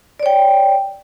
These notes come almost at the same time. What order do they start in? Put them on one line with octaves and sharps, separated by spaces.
D5 C#5 G5